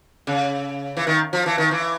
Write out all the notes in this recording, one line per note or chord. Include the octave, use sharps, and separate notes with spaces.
C#3
E3
D#3
F3
E3
D#3
E3